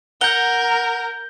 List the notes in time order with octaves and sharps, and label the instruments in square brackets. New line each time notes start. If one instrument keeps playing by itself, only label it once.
[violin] A#4 [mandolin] F#5 A#5 [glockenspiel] G6 G7